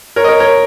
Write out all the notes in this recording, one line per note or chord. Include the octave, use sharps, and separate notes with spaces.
A#4 C#5
D#5
A#4 C#5
A#4 C#5